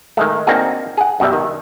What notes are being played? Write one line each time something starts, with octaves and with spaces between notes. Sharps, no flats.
D#3 G#3 A3
A#3 C4 D4 D#4 F#4 G#4
G#4 F#5
F#2 B2 G3 E5
D#3